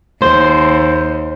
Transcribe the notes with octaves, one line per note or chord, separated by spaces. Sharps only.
D#2 C5